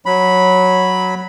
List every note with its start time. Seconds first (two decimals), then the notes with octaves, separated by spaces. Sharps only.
0.06 F#3 B5